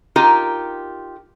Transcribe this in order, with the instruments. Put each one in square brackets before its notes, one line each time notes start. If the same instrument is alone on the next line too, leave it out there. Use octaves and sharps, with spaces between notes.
[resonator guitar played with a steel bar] D#4 F4 G4 A#4